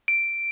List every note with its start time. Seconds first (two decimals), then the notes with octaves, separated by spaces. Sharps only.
0.08 D7